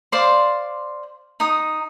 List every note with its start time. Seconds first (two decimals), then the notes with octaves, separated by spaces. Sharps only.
0.12 C5 D5 F5 C6
1.40 D#4 D#6